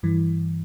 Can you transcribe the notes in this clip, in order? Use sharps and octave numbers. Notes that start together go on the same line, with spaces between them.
G2 E3